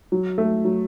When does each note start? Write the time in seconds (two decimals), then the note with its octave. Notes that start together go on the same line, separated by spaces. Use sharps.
0.12 F#3
0.38 A3
0.65 F#3